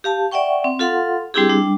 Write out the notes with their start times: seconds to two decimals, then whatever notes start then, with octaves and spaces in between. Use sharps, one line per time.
0.04 G4 F5 A5
0.31 D5 E5 F#5 G5 C#6
0.64 C4
0.79 F4 A4 F5 F#5 C6
1.34 G3 C4 D4 E4 G4 G#4
1.50 G3 D4